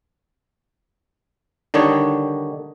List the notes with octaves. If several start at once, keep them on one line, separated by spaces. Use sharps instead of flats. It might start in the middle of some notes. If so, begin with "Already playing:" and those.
D3 D#3 G3 D4 D#4 C#5